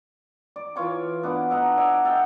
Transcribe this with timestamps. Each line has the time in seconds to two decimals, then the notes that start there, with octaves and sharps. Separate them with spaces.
0.56 D5
0.76 E3 F4 C#5 D6
1.23 B3 D4 F#5 D6
1.50 A4 D#5 F#5 A#5
1.77 D5 E5 G#5
2.05 A4 D#5 F#5 G5